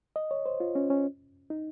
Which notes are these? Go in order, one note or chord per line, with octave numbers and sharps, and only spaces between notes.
D#5
C#5
C5
F4
C#4
C#4
D#4